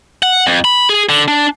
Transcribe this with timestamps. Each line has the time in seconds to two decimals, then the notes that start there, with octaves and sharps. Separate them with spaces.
0.23 F#5
0.47 F2
0.65 B5
0.89 G#4
1.09 D3
1.28 D4